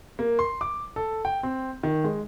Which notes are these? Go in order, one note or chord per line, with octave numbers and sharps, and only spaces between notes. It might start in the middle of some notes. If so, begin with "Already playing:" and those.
A#3
C6
D6
A4
G5
C4
D#3
G#3